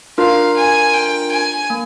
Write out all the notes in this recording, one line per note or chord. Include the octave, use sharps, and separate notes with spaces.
D4 F4 A#4 F5
G#5
G5
G#5
A#3